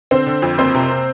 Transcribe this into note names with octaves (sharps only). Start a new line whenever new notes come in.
D3 C4 C5
D3
F2
F#1 C4 C5
C3
C3